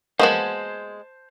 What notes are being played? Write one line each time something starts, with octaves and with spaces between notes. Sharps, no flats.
G#3 A#3 B3 F#4 C5 A5